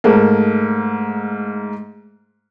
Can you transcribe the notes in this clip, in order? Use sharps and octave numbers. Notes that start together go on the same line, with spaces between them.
G#2 A3 A#3